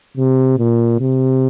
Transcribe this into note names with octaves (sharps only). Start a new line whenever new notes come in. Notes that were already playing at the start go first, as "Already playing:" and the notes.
C3
A#2
C3